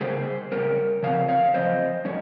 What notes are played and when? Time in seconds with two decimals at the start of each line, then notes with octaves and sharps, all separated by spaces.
0.01 C#3 G3 A#3 C#4 G#4 C5
0.52 C#3 G3 A#3 C#4 A#4 C#5
1.03 C#3 F3 C4 C#5 F5
1.28 C#5 F5
1.54 C#3 F3 C4 C5 D#5
2.05 G3 C#4 C#5